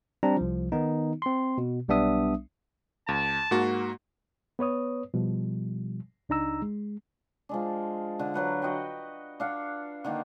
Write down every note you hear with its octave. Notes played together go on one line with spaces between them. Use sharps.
G3 C4 D4 A#5
C2 F3
D#3 B3 D#4
C4 C6
B2
B1 G3 B3 D4 E5 D#6
C#2 A5
G#2 A#3 F#4
B3 B4 C#5 D#6
B2 F3 G3
C#2 D4 D#4 A#5 E6
G#3
F3 G#3 D4
D3
F#3 B4 F#5
F#4 D#5 F#5 G5
D4 F5 F#5
D3 D#3 A#3